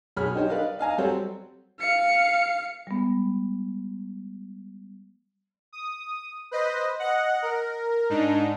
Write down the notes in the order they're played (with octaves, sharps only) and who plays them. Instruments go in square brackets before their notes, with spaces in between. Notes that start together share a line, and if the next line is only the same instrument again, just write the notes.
[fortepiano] B1 G#4 C#5 B5 F6
D#4 G4 C5 C#5 D#5
B4 D5 D#5 F5
D#5 F5 G#5 A#5
F#3 G3 C4 A4 C5 C#5
[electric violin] F5 C#7
[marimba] G3 G#3 B3
[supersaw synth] D#6
B4 C5 D#5
D#5 F#5
A#4
G#2 D4 D#4